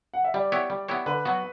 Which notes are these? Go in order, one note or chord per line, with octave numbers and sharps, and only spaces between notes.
F#5
E5
G3 D5
B3 E4 G4 C#5
G3
B3 E4 G4 C#5
D3 B4
F#3 B3 F#4